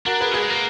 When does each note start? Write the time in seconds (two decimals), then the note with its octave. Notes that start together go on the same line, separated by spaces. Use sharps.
0.06 D4 F#4 A#4
0.20 G#4 B4
0.34 G#3 G#4 B4
0.50 A#3